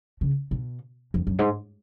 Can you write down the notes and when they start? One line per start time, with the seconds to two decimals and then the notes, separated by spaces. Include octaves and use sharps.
0.21 C#3
0.51 B2
1.14 F2
1.27 F#2
1.39 G#2